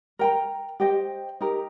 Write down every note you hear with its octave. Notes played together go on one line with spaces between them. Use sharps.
A#4 G5 A#5
G4 C5 D#5 G5
D#4 G4 A#4